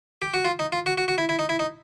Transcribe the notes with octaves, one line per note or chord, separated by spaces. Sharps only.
G4
F#4
F4
D#4
F4
F#4
F#4
F#4
E4
E4
D#4
E4
D#4